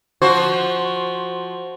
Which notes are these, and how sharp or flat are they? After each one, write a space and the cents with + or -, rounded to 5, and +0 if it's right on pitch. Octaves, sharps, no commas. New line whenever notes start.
F3 +0 F#4 +0 C5 +10